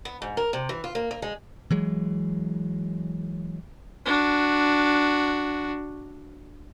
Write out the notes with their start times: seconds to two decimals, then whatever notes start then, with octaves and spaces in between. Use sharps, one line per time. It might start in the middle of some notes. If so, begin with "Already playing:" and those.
0.05 B3
0.22 G#2
0.37 A#4
0.53 C3
0.69 E3
0.84 F4
0.95 A#3
1.11 A#3
1.22 G#3
1.71 E3 F#3 G#3
4.06 D4 F#4